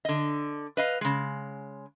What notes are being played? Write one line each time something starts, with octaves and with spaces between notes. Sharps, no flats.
D3 D#5
B4 D#5 F5
C#3 G#3